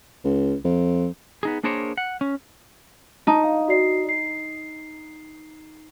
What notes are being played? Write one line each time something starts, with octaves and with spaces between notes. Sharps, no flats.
C#2
F2
B3 D#4 G#4
A#3 D4 G#4 A#4 C5 C#5
F#5
C#4
D#4 A5
F5
F#4 D5 C7
C7